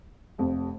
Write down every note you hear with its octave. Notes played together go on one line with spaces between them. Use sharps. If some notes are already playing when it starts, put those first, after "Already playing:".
F1 F2 C3